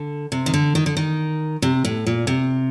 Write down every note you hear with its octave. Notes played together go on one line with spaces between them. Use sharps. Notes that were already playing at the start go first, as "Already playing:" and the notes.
Already playing: D3
C3
D#3
D3
D#3
D3
D#3
C3
A2
A#2
C3